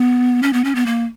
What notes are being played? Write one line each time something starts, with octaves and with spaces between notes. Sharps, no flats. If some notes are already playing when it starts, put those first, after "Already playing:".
Already playing: B3
C#4
B3
C#4
B3
A#3